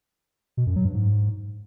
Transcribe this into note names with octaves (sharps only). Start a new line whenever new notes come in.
B2
F#2
F#3
G2
G#2